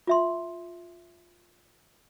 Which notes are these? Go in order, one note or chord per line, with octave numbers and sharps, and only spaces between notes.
F4 E5 C6